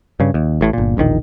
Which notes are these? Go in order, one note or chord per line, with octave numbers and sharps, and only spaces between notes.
G2 C#3
D#2
A1 A2
G1 A#2
E1 A#1 A2 D#3